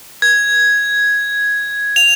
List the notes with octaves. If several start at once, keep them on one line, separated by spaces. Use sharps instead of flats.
G#6
F7